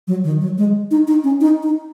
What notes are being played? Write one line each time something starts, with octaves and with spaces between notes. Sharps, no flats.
F#3
D#3
F#3
G#3
D#4
D#4
C#4
D#4
D#4